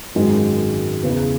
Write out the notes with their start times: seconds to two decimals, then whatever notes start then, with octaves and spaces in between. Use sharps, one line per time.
0.15 G#1 F#2 D#3 G#3
1.03 E2 C#3 E3